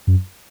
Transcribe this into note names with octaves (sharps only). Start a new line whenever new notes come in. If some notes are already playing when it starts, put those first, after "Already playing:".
F#2